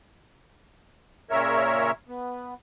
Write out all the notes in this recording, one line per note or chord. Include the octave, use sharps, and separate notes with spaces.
A#2 C#3 A#4 C#5 E5
B3